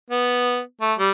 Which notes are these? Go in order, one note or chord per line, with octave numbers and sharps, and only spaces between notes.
B3
A3
G3